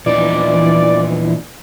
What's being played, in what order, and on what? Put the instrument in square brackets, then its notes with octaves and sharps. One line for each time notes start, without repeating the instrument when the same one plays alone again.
[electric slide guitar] A#2 D#4 [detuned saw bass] E3 [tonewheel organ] F3 B3 D4 [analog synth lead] D5